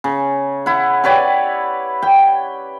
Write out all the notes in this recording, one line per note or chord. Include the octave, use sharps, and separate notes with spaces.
C#3
E4 F#5
G4 B4 C#5 D5
G5